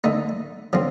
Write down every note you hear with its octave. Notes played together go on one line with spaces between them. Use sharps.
D3 A3 D#4
D3 F3 C4